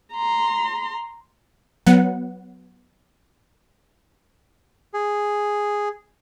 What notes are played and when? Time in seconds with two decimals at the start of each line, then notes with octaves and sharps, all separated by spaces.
0.14 A#5 C6
1.86 F#3 B3 F#5
4.94 G#4